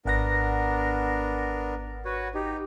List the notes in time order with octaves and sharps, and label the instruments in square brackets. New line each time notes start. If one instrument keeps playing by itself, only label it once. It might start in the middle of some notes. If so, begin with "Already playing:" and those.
[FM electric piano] G#1 F#5 A#6 [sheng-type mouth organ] B3 D4 A#4
[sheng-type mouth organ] F#4 B4 C#5
D#4 G4